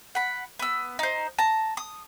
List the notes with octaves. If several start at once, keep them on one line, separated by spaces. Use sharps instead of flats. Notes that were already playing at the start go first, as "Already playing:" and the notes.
F#5 B5
B3 E6
D#4 C5
A5 A#5
D#6